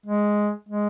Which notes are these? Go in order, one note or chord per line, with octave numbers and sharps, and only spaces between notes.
G#3
G#3